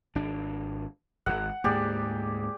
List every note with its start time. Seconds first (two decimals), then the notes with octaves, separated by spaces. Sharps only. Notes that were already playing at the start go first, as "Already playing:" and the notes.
0.15 G#1 D4
1.26 D#1 G#1 F#5
1.64 D2 G#2 A#3 G4 G#4 D5